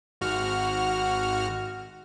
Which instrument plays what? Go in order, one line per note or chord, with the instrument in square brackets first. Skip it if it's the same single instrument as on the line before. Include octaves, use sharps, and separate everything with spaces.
[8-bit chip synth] G#1 F#4 F6